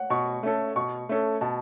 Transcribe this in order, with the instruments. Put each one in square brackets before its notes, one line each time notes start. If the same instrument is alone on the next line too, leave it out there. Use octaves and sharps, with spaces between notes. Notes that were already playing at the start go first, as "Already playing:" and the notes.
Already playing: [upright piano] C#5 F#5
[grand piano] B2 [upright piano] C#6
[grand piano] A3 C#4 A4
[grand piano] B2 [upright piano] C#6
[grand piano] A3 C#4 A4
[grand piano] B2 [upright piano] A5